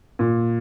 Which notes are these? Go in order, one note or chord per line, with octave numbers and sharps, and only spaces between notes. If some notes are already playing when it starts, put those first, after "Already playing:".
A#2